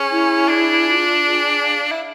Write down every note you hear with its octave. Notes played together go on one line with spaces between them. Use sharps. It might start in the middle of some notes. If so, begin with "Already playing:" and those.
Already playing: C#4 G#4
E4
D4 G#4
F4
G#4
F5
E4